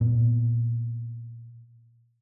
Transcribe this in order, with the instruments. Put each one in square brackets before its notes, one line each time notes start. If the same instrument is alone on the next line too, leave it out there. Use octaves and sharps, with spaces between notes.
[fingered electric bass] A#2 B3